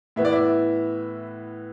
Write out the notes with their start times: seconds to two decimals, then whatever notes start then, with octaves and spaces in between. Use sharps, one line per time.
0.16 A2 E3 B3 E5
0.25 D5
0.33 E5